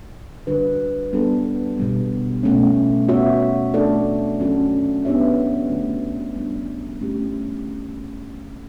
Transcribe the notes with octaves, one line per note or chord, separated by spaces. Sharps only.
D3 G3 D4 F#4 B4
G3 B3 D4 A4
B2 G3 B3
B2 A3 C#4
B3 F#4 C#5 E5
A3 D4 A4 D5
F#3 C#4 F#4 A4
B3 D4 G4 C#5 E5
D3 A3 C#4 F#4
G3 B3 D4
A3 C#4 E4 G4